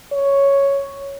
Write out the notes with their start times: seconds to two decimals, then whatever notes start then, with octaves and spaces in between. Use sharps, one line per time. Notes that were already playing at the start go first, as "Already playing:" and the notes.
0.12 C#5